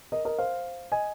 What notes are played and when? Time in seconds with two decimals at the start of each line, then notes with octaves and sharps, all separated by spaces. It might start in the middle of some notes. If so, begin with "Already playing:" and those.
0.12 A#4 D#5
0.25 A#4 D#5
0.38 C5 F5
0.92 D#5 G#5